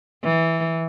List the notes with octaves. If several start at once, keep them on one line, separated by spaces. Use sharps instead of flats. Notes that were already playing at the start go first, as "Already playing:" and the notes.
E3